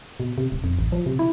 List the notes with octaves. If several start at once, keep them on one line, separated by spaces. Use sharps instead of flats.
B2
C3
D#1
F2
A1
F3
C3
E4